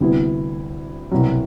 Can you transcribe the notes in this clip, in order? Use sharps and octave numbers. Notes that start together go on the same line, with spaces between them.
D2 C3 G3 B3 E4
C2 B2 F#3